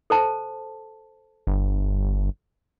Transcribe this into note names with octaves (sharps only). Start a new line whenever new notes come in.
A4 C5 A5
G1